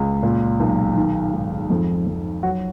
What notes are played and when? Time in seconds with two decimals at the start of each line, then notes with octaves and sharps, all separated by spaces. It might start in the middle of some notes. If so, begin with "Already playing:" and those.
Already playing: C#2
0.23 A#2
0.60 B1
0.97 D#3
1.33 G#2
1.70 F2
2.06 F2
2.43 F#3 F#4